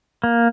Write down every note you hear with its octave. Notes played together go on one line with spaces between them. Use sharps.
A#3